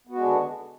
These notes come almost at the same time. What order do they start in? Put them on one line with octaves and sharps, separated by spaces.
B3 F#4 G#3 D4 D3